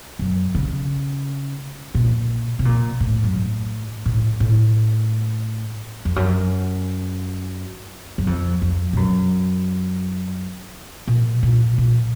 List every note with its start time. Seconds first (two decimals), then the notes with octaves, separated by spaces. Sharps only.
0.19 F#2
0.55 C#3
1.95 A#2
2.59 C3
2.65 A#2
3.00 A2
3.24 F#2
3.35 A2
4.06 A2
4.40 A2
6.05 F2
6.16 F#2
8.18 F#2
8.27 F2
8.62 F2
8.93 A2
8.97 F#2
11.07 A#2
11.43 A#2
11.78 A#2